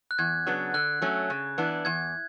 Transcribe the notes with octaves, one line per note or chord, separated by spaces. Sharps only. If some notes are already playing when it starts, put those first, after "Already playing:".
F#6
E2 G#6
C#3 F#3 B3 D4
D3 F#6
F#3 A3 C#4
C#3
E3 B3 D4
E2 G#6